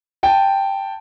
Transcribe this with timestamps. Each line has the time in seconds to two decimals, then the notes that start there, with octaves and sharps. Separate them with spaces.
0.23 G5 A5